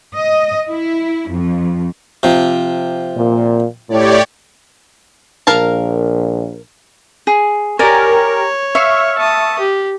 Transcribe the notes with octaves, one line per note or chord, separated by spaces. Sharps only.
D#5
E4
F2
C3 F3
A#2
A2 G4 C#5 D5
A#1 A#4 F5 A5
G#4
G4 A#4 C#5 D5 G#5
E5 F5 C#6
A5 D#6
G4